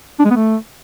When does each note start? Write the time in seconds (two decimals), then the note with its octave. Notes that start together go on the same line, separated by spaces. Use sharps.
0.19 D4
0.25 G#3
0.31 B3
0.36 A3